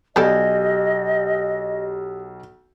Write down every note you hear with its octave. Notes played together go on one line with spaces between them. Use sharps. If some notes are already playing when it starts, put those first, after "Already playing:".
B1 B3 G4 A4 D5 D#5 G#5 G6